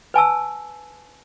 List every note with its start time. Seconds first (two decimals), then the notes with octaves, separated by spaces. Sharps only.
0.14 B4 G#5 A5 E6